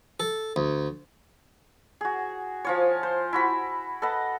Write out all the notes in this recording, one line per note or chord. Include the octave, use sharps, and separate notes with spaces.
A4
D2
F#4 G#4
F3 F4 C#5
C5
E4 F#4 B5
A4 B4 D#5 F#5